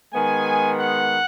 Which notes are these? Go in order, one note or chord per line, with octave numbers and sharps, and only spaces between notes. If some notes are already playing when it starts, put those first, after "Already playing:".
D#3 G#3 B3 G#5
F#5